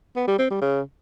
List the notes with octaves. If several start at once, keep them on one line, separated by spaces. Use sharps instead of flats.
B3
G3
C4
G3
C#3